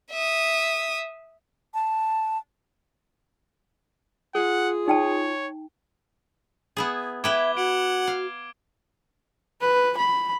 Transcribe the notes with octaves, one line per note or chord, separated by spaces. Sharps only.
E5 D#6
A5
F4 G#4 F#5
D#4 C#5 G5 A5
B3 E4 G#4
E4 B4 E5 G5 D6 G#6 G7
F#4 F#5 D7
F5
B4
B5